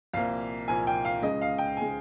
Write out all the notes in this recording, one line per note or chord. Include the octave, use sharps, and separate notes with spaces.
C2 A#2 F3 A#3 F5
C2 A#2 F3 A#3 G#5
G5
F5
C#2 C#3 G#3 D#5
F5
G5
C#3 G#3 G#5